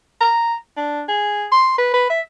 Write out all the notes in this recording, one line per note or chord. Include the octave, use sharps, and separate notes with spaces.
A#5
D4
G#4
C6
B4
B4
E5